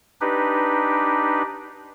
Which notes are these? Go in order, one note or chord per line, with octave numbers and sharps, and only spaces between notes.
D4 D#4 G4 B4